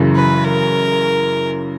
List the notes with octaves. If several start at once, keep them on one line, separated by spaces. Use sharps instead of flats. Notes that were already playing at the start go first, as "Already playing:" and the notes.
Already playing: F#1 F#2 C#3 E3
B4
A#4